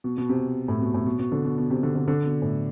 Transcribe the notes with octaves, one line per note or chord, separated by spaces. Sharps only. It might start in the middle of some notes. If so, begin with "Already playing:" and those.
B2
B2
C3
A2
B2
A2
B2
B2
D3
B2
B2
C3
D3
D3
D3
B2
A2